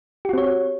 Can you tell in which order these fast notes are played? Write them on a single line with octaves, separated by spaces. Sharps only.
G4 F#4 C4 C#5